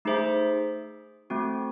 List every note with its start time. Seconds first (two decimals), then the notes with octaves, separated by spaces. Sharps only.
0.05 A3 D#4 G#4 C5 E5
1.30 A3 C4 F#4